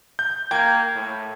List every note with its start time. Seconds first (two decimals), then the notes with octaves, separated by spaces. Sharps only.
0.19 G6
0.51 A#3 G5 G#6
0.95 A2